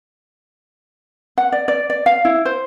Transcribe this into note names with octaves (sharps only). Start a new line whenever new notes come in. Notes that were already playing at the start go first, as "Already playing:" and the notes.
F#5
D5
D5
D5
F5
E4
C5